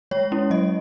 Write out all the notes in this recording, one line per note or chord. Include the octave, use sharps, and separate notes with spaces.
G#3 C#5
C#4 E4
F#3 D#5